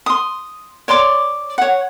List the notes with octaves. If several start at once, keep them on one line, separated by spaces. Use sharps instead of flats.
C6 D#6
C#5 D5 C6 D6
C#5 F#5